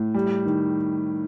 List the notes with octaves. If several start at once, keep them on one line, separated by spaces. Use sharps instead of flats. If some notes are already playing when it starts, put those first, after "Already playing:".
Already playing: A2
G3
D#3